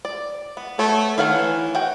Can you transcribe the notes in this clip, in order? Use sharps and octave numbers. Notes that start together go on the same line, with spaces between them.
D5
B3
A3 B3 C#5
D#3 C#5 F5 F#5
E3
F#4 G5